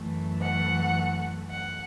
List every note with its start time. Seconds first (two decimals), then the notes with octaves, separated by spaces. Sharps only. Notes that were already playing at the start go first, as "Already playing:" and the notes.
Already playing: F#2 E3 A3
0.41 F#5
1.51 F#5